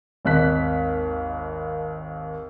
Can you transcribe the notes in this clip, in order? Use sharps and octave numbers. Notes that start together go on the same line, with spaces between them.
G#1 D#2 F#6 B6